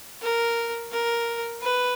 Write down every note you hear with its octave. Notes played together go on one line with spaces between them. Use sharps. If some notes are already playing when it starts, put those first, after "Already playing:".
A#4
A#4
B4